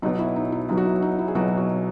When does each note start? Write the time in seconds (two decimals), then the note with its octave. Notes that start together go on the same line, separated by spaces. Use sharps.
0.02 B1 B2 F#3 D#4
0.19 E4
0.36 D#4
0.52 E4
0.69 B1 B2 F#3 D#4
0.77 F#4
0.85 E4
1.02 D#4
1.19 E4
1.28 G#4
1.35 B1 B2 F#3 F#4
1.58 F#4